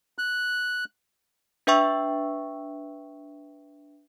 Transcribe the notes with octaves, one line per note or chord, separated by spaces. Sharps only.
F#6
D4 B4 E5 G5 C#6 E6